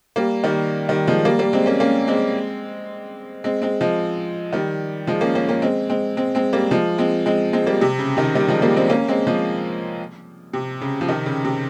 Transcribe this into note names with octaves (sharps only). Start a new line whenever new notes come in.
G3 A#3
D#3 G3
D#3 G3
F3 G#3
G3 A#3
G3 A#3
G#3 C4
A#3 C#4
A#3 C#4
G#3 C4
G#3 C4
G#3 C4
F3 G#3
D#3 G3
F3 G#3
A#3 C#4
A#3 C#4
A#3 C#4
G#3 C4
G#3 C4
G#3 C4
G#3 C4
G3 A#3
F3 G#3
G#3 C4
G#3 C4
G#3 C4
G3 A#3
C3
C#3
C3 D#3
D#3 G3
F3 G#3
G3 A#3
G#3 C4
A#3 C#4
G#3 C4
F3 G#3
C3
C#3
F3
C3 D#3
C#3
C3